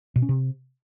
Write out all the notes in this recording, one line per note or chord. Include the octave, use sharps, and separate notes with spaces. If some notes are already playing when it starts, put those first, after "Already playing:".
B2
C#4
C3